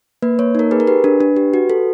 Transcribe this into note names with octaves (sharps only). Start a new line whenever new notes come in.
A#3 B4
A#3 C#5
D#4 A#4
G#4 B4
A#4
G4 B4
D4
D4
G4
F#4
A4